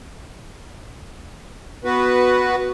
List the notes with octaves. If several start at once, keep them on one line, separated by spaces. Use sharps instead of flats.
B3 F#4 B4